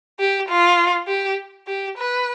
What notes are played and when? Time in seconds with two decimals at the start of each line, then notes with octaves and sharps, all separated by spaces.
0.19 G4
0.49 F4
1.08 G4
1.67 G4
1.98 B4